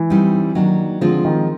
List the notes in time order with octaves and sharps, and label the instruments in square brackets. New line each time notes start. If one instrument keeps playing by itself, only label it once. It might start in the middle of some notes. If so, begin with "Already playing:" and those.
Already playing: [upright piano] E3
[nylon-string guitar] G3 C4 D#4
[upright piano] D#3 [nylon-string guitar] F#3 A#3 D4
[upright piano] D3 [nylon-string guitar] F3 G#3 C4 F4
[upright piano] D#3